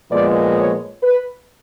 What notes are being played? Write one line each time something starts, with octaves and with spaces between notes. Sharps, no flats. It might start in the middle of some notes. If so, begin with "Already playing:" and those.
A#2 F3 G#3 B3 D5
C#5
B4